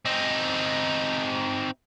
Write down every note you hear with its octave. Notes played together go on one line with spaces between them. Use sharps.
C4 D#4